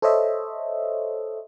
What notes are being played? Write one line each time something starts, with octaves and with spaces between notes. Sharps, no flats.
A4 C5 C#5 D#5 E5